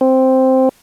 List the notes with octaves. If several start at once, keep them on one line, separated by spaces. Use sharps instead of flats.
C4